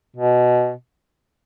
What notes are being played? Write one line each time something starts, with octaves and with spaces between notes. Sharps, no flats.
B2